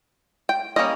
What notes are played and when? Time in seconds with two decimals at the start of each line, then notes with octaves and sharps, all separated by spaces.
0.49 G5
0.76 G3 A#3 C#4 D#5